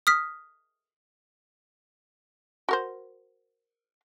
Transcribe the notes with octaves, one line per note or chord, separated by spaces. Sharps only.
D#6 F6 B6
F#4 A#4 C5